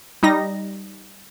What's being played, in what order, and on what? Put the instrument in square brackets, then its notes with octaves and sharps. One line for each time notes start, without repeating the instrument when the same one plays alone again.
[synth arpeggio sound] G3 D#4 A#6